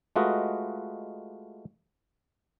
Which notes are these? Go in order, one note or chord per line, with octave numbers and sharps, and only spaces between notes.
G#3 A3 F4 F#4 B4 D#5